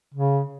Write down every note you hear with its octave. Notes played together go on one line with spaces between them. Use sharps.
C#3